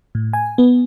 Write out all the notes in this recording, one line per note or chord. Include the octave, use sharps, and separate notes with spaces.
A2
G#5
B3